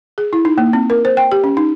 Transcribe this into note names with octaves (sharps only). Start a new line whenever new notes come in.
G#4
E4
D#4
A#3
C4
A#4
C5
G5
G4
C#4
D#4